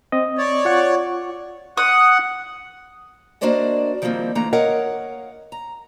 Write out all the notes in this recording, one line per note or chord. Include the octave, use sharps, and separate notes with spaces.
C4 D#5
C#5 D5
F4 F#5 C#6
F#5 D#6
A#3 D4 F#4 C5 D5 D#5
D#3 F3 G3 G#3 A#3 C4
D3 E3 A3 A#3 A#5
A#4 C#5 D#5 F5 F#5
A#5